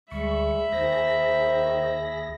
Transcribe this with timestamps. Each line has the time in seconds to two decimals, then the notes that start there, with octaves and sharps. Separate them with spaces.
0.11 D2 G3 G#3 E5 B5 C#6
0.72 D#2 D#3 G#4 C5 A#6